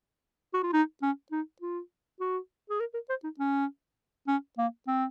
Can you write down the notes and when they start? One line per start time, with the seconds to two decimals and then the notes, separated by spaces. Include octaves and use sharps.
0.54 F#4
0.63 F4
0.73 D#4
1.02 C#4
1.32 D#4
1.62 F4
2.20 F#4
2.70 G#4
2.80 A#4
2.94 A#4
3.09 C5
3.24 D#4
3.39 C#4
4.28 C#4
4.58 A#3
4.87 C4